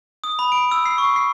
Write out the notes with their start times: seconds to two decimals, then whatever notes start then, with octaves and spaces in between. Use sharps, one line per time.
0.24 D#6
0.39 B5
0.52 D7
0.71 E6
0.86 C7
0.98 C#6
1.16 C7